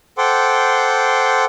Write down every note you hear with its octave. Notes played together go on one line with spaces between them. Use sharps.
A4 C5 F#5 G5 C6 D6